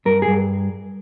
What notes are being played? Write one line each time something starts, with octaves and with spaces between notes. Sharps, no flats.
G2 A#4
G#4
G2